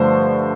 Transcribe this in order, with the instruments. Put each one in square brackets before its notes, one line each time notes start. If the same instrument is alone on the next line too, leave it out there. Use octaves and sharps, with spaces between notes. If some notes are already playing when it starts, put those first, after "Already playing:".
Already playing: [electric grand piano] G2 D3 F3 A3 C5